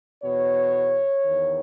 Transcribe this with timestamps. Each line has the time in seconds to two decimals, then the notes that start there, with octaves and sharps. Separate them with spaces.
0.23 E2 B2 C#5
1.25 E2 D#3